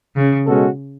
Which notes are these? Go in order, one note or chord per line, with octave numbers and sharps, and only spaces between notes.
C#3
B2 G#3 C#4 F#4 A4